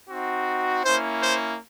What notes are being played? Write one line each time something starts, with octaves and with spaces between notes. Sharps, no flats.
C4 D#4 F#4
A#3 C#4 E4 C5
C5